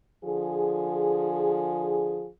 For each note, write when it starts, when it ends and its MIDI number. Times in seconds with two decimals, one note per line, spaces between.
0.25 2.28 50
0.25 2.28 53
0.25 2.28 68